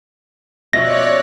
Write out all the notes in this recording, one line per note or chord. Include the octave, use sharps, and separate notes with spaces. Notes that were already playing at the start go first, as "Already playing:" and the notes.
B2 F3 C#4 C#5 D5 E5 F#6 A#6